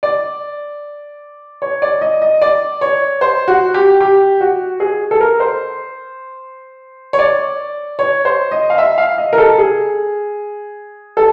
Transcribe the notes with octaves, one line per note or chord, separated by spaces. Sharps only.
D5
C#5
D5
D#5
D#5
D5
C#5
C5
F#4
G4
G4
F#4
G#4
A4
A#4
C5
C#5
D5
C#5
C5
D#5
F5
E5
F5
D#5
A#4
A4
G#4
A4